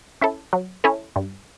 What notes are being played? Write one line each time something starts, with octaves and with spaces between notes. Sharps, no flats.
C#4 E4 A4
F#3
C#4 E4 A4
G2